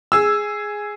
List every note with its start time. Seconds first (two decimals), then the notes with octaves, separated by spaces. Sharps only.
0.12 G#4 E6